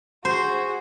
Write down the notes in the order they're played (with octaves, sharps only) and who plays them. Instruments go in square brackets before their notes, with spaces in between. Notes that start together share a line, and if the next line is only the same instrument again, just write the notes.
[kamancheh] F#4 G#4 [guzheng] C5